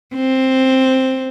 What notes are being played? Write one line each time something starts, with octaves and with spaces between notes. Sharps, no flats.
C4